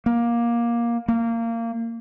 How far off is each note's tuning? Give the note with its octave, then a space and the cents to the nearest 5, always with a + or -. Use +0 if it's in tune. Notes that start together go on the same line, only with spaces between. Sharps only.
A#3 +15
A#3 -20